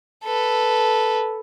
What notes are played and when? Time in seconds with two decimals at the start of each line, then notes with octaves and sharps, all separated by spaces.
0.24 A4 B4